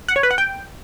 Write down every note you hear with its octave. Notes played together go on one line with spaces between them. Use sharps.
F#5
C#5
B4
F#5
G5